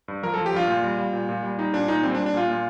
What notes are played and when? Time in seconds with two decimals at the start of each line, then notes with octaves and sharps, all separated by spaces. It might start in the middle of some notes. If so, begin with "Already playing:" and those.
0.08 G2
0.23 F3 A#4
0.34 F3 A4
0.46 G4
0.53 G2 F4
0.68 A#2
0.83 G3
0.98 G3
1.13 A#2
1.29 A#2
1.43 G3
1.58 G3 D#4
1.73 A#2 D4
1.88 A#2 D#4
2.03 G3 C4
2.15 D4
2.19 G3
2.26 D4
2.34 A#2 F4
2.49 A#2